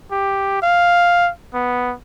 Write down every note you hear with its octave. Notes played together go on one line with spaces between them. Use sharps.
G4
F5
B3